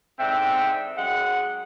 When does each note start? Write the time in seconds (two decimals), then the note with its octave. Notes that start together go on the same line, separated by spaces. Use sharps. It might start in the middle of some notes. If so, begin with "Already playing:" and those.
0.19 G#2 D3 C4 E5 G5
0.97 F#2 G#3 F#5